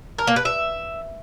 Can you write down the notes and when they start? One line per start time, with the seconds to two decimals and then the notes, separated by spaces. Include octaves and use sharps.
0.19 A#4
0.27 A#3
0.36 B4
0.45 E5